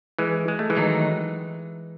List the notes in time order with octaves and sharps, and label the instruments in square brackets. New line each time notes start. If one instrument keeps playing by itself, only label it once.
[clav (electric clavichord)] E3 G#3
G#3
A3
E3 G#3
[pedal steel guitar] D#3 F#3 A3 D#4